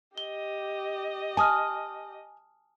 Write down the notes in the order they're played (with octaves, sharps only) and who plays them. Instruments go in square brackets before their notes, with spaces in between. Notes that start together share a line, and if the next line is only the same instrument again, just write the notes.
[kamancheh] G4 D#5 [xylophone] G7
[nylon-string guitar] G#5 [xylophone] A5 D#6 F6